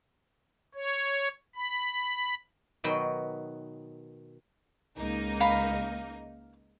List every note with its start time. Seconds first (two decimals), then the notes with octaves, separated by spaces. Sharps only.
0.75 C#5
1.55 B5
2.84 B2 D#3 F#3 B4 G5
4.98 C#2 A#3 D#4
5.40 F5 A#5 B5